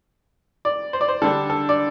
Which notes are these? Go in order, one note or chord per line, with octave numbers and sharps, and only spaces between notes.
D5
C5
D5
C5
D3 G3 D4 A4
A4
D5